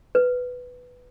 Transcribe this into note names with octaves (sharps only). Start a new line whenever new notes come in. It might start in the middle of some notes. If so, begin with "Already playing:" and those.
B4